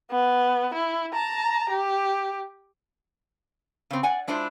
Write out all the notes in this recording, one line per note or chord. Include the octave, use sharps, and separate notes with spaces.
B3
E4
A5 A#5
G4
C#3 C4
D5 F#5 G#5
G#3 D4 E4 F4 C5